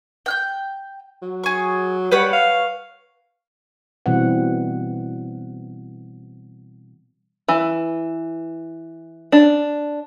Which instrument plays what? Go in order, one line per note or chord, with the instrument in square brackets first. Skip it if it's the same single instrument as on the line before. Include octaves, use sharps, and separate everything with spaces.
[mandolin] G5 F#6 G6
[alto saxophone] F#3
[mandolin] G#4 C#6
[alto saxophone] G3 [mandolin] B4 C#5 F#5
[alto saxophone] F5
[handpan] B2 E3 G3 C4 F#5
[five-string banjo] E3
D4